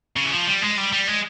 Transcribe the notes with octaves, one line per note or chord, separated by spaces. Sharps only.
C#3
E3
F3
G3
G#3
G3
G3
G#3